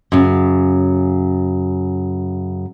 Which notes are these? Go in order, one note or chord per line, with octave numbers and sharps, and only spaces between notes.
F#2 C#3